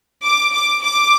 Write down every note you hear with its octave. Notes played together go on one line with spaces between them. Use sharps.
D6
D6
D6